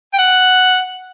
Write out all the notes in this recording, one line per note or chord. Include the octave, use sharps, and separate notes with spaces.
G5
F#5